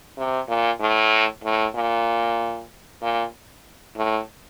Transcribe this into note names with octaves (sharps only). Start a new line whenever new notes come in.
C3
A#2
A2
A2
A#2
A#2
A2